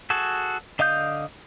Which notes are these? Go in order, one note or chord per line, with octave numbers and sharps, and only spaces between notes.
F#4 G#4 A4
D3 D#5 F5 D#6 G6